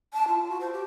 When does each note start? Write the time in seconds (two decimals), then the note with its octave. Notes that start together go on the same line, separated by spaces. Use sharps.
0.13 A5
0.28 F4
0.49 F#4
0.60 C5
0.73 G4